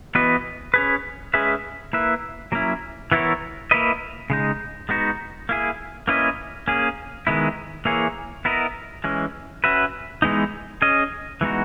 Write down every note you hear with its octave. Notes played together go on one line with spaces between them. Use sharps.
E3 B3 F#4 B4 D#5
C#4 G#4 B4
G#3 C#4 G#4 B4 E5
A#3 E4 B4 E5
F#3 A#3 C#4 E4
E3 B3 E4 A#4 C#5
A#3 E4 B4 D#5
C#3 G#3 D#4
G#3 B3 D#4 F#4
A#3 E4 G#4
A#3 C#4 E4 B4 D#5
A#3 C#4 G#4
D#3 G#3 B3 E4
E3 A#3 E4 G#4 C#5
B3 E4 A#4 D#5
E3 G#3 C#4
C#4 F#4 B4 E5
E3 G#3 B3 D#4
C#4 G#4 D#5
E3 G#3 B3 D#4 F#4